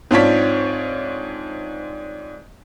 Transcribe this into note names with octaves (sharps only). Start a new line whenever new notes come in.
G#2 C4 D4 F4 C#5 B6